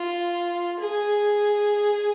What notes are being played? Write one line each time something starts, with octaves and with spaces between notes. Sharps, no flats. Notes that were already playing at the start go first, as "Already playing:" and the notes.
Already playing: F4
G#4